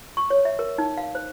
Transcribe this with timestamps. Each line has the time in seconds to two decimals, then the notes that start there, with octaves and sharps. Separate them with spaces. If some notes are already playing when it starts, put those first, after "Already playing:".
0.17 C#6
0.30 C#5
0.45 E5
0.59 A#4
0.78 D#4
0.98 F5
1.15 C5